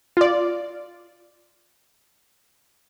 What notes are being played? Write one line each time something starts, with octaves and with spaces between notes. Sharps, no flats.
F4 D5